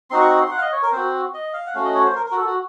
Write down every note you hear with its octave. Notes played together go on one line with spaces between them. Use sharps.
C4 D#4 F#4 C6
C#6
C6
F#5
F5
D#5
C#5
A#4
C4 F#4 C5
D#5
F5
F#5
A3 C#4 F#4 F5
D#5
C#5
C5
A#4
A#4
F#4
A4
F#4